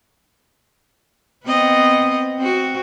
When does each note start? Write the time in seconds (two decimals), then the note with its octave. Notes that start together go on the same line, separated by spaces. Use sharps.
1.45 B3 C4 D#5
2.39 C4 F#4